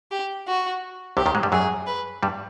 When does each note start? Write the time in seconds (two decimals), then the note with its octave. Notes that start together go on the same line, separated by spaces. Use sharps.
0.11 G4
0.48 F#4
1.17 C2 C3 G4
1.26 D#2 D#3
1.35 G#2 G#3
1.43 G2 G3
1.52 F#2 F#3 G#4
1.87 B4
2.23 G2 G3